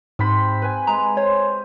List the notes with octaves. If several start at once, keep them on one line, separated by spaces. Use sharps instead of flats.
G#2 C3 C5 B5
B4 G#5
G#3 A#5
C5 C#5